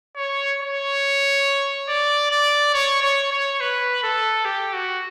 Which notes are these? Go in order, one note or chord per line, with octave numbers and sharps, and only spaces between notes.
C#5
C#5
D5
D5
C#5
C#5
C#5
B4
A4
G4
F#4